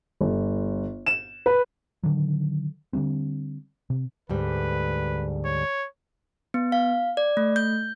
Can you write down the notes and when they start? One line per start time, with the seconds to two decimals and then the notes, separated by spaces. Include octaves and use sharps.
0.21 G1
1.06 E7
1.46 B4
2.03 D3 D#3 F#3
2.93 D3 E3 G3 C4
3.90 C3
4.29 D2 G#2 G3 B4
5.45 C#5
6.54 B3
6.72 F5
7.17 D5
7.37 A3
7.56 G6